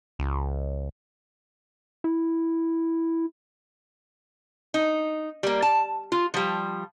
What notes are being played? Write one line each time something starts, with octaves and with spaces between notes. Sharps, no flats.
C#2
E4
D#4
G3 A#3
A5
F4
F3 G3